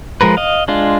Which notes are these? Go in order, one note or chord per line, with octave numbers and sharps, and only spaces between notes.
F3 G#3 A#4 B4
D#5 F5
G#3 D4 F4